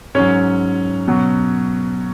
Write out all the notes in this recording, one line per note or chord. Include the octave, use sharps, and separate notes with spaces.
G#2 F#3 C#4 C#5
B2 F#3